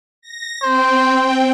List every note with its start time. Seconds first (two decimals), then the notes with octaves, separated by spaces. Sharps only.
0.21 A#6
0.63 C4 C5 G5